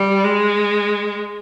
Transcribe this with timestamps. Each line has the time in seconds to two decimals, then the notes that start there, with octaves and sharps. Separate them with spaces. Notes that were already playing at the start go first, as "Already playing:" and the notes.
Already playing: G3
0.24 G#3